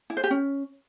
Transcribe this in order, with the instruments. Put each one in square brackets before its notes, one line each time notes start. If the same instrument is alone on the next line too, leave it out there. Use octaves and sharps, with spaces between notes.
[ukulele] E4
C5
G4
C#4